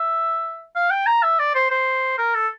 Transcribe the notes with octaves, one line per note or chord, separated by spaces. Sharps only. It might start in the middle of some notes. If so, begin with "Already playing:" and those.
Already playing: E5
F5
G5
A#5
E5
D5
C5
C5
A#4
A4